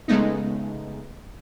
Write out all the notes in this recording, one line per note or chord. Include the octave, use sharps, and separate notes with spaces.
C#3 G#3 A3 B3 D#4